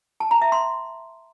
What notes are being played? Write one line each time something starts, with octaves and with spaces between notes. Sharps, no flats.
A5
A#5
E5
C6